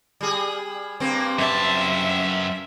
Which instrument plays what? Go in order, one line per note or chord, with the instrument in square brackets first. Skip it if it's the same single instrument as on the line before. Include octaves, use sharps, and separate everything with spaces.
[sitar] G3 G#4
G2 A#3 C4
[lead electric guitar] F#2 A5 [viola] E5